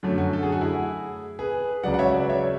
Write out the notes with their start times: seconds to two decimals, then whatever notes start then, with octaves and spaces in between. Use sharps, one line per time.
0.03 F#2 D3 F#3 A3
0.18 F#4
0.33 A4
0.43 G#4
0.52 F#4
0.61 E4 G#4
1.39 G#4 B4
1.83 C#2 C#3 F#3 D5 F#5
1.94 F#5
1.99 C#5 E5
2.14 B4 D5
2.29 C#5 E5